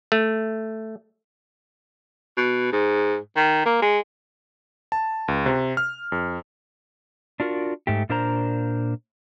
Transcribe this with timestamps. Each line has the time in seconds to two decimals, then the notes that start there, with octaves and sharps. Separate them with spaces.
0.12 A3
2.37 B2
2.72 G#2
3.36 D#3
3.66 A#3
3.82 G#3
4.92 A5
5.28 C#2
5.46 C3
5.77 F6
6.12 F2
7.40 D4 F4 F#4 A#4
7.87 G#2 A3 G4
8.09 A#2 D4 A#4 C5 A#5